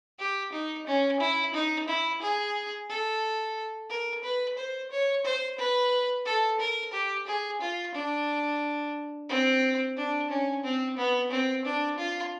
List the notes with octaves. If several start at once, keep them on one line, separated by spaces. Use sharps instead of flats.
G4
D#4
C#4
E4
D#4
E4
G#4
A4
A#4
B4
C5
C#5
C5
B4
A4
A#4
G4
G#4
F4
D4
C4
D4
C#4
C4
B3
C4
D4
F4